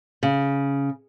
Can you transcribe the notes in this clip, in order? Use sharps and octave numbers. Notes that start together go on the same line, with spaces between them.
C#3